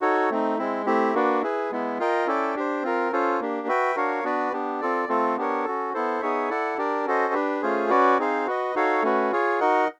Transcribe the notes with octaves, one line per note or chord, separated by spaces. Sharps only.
D#4 F#4 A4 C#5
A3 C4 D#4
G#3 C4 E4
A3 C4 E4 G4
A#3 D4 F#4 B4 D5
E4 G#4 B4
G#3 B3 E4
F4 A#4 D#5 G5
C#4 E4 A4 D5 G5
D4 G4 C5
C4 F4 A#4
C#4 F4 A4 C5
A#3 D4 G4
F#4 B4 E5 G5
D4 F#4 A#4 C#5 F5
B3 D4 F#4 B4 D5
B3 D4 G4
C4 F4 A4 D5
A3 C4 F4 A4
B3 D4 G4 A#4 C#5
C#4 F#4 A4
B3 E4 A4 C5
B3 D#4 G#4 C#5 E5
E4 A4 D5 F#5
D4 G4 A#4 D5
C#4 F#4 A4 C5 D#5
D4 G4 B4
A3 C#4 F4 G#4 C5
C#4 F#4 B4 D5
C4 D#4 G#4 C5 F5
F#4 B4 D#5
D#4 F#4 A4 C#5 F5
A3 C#4 F#4 B4
F4 G#4 C#5
D#4 F#4 A#4 D#5 F#5